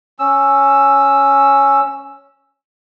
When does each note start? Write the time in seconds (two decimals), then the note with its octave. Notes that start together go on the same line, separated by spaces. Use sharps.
0.19 C#4 E6